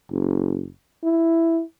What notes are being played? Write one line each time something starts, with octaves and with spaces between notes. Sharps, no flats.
F#1
E4